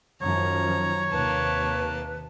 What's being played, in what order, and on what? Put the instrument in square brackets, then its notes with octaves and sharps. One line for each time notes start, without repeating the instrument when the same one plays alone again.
[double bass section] F#2 D#3 F3 [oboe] C#5 [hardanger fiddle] A#5
[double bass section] D#2 C3 [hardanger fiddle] A#3 A5 [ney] B4